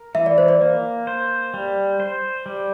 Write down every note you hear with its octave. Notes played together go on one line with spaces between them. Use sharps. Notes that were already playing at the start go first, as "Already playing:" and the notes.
Already playing: A#4
E3 E5
D5
C5
D5
A#3
C5
G3
C5
G3